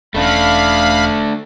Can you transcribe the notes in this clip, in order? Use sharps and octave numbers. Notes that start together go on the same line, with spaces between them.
E1 A3 C#4 D4 F5 B5